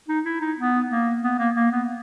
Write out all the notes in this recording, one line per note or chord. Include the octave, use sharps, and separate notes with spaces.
D#4
E4
D#4
B3
A#3
B3
A#3
A#3
B3